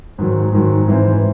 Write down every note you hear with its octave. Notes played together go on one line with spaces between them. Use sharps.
G#2 D#3 F#3
G#2 D#3 F#3
G#2 E3 C4 E4